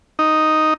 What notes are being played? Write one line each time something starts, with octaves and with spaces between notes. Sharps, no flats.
D#4